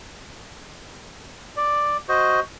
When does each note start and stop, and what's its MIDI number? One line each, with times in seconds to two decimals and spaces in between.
1.57 1.97 74
2.09 2.40 66
2.09 2.40 72
2.09 2.40 75